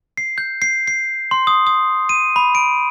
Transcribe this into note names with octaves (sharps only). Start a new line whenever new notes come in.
C7
G6
C7
C7
C6
D#6
D#6
D#7
B5
D7